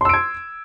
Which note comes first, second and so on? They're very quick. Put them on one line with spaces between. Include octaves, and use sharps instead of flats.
C6 E6 D7 G#6